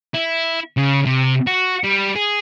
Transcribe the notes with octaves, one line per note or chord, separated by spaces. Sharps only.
E4
C#3
C3
F#4
G3
G#4